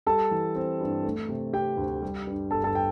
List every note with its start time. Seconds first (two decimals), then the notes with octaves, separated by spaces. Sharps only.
0.06 G3 A4 A5
0.31 E3
0.56 C4
0.81 G2
1.04 A3
1.29 C3
1.53 C4 G4 G5
1.77 D2
2.02 G3
2.27 G2
2.51 G1 A4 A5
2.64 A4 A5
2.75 G5